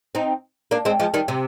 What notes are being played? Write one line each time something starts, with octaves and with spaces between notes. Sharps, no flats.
C4 D#4
A#3 D4
G#3 C4
F3 G#3
D#3 G3
C3